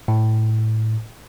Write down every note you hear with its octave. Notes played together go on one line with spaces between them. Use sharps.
A2